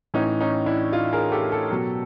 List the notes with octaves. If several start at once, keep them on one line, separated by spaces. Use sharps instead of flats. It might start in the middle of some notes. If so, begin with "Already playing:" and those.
A2 E3 C#4 D#4
C#4 D#4
D4 E4
D#4 F4
G#4 A#4
G4 A4
G4 A4
B2 F#3